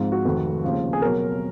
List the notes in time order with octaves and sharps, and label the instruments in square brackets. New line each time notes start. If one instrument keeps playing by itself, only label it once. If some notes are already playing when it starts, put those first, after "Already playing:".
Already playing: [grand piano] G#1 G#2 F3
F#4
F1 F2 D#3
D#2 C#3 F3
G#4
B2 F#3 A#4